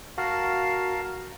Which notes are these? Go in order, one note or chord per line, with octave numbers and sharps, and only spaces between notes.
F#4 A#4 F5 A5